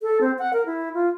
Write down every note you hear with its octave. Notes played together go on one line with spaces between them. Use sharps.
A4
C4
F#5
A#4
E4
F4